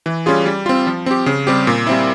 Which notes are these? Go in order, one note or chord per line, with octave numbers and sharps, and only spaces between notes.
E3
G3 C#4 F4 G#4
G3
C4 F4
F3
C4 G4
C#3
G3 C4 G4
A#2
G3 C4 E4